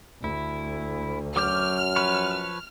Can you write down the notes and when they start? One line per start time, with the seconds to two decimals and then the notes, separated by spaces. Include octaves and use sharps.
0.24 D2 E4
1.36 F#2 F#3 D6 F6 G6
1.96 F3 B4 C#5